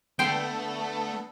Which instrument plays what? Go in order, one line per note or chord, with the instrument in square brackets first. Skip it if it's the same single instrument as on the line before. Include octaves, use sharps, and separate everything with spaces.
[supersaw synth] D3 B3 A4 [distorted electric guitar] A3 [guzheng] G5 C6